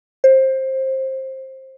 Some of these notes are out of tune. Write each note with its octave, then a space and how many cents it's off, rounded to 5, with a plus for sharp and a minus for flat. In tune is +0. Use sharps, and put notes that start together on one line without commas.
C5 +20